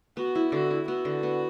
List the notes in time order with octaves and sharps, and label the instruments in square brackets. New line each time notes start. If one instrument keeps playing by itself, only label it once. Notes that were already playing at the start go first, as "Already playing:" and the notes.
[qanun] B3 [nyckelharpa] F#4
[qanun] E4
[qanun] D3 [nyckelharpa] F#4
[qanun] E4
[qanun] B3 [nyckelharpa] F#4
[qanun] D3
B3